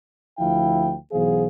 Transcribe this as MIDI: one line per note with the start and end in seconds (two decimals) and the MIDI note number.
0.39 0.95 38
0.39 0.95 53
0.39 0.95 64
0.39 0.95 77
0.39 0.95 79
1.12 1.48 35
1.12 1.48 52
1.12 1.48 59
1.12 1.48 68
1.12 1.48 72
1.12 1.48 77